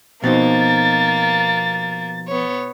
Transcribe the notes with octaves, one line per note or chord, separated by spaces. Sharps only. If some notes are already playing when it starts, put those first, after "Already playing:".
B2 F3 A#3 C4 D#4 A6
B3 C#5